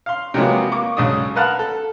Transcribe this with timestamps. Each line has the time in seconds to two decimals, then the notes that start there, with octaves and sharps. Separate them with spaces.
0.06 F5 C6
0.34 C3 F3 F#3 G#3 A#3 B3
0.72 A#3 C#6 D6
0.97 B1 C#3 G#3 D4 D#6
1.36 A#4 B4 F5 F#5 A5
1.59 A4